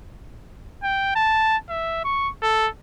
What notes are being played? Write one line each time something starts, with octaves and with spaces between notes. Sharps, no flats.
G5
A5
E5
C#6
A4